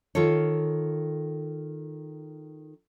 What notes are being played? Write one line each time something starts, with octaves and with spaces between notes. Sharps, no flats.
D#3 F4 A4 C#5